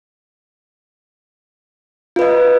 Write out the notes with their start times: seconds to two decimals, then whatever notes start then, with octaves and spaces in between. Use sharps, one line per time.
2.16 F4
2.19 B4
2.22 D#5